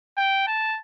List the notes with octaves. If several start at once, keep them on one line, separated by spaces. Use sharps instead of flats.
G5
A5